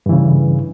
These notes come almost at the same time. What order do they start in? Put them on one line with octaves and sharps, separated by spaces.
G2 E3 C#3